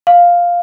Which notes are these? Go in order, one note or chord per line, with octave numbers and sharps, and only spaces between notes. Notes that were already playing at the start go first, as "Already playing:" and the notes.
F5